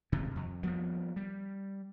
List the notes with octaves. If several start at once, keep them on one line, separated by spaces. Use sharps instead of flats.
D#1 G#1 A2 C3
F2
F3 G3 A#3 B3
G3